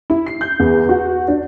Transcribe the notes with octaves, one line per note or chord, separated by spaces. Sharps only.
E4
C7
G6
E2
F#4
D4